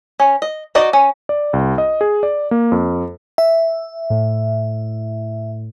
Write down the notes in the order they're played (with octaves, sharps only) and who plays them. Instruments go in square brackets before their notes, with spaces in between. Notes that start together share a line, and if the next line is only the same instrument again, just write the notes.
[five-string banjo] C#4
D#5
D#4 F#4 D5 D#5
C#4
[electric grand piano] D5
C2
D#5
G#4
D5
A#3
F2
[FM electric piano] E5
[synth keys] A2